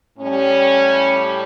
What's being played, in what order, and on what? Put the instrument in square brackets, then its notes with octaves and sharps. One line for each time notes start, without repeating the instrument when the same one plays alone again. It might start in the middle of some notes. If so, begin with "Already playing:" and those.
[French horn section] A2 G3 C#4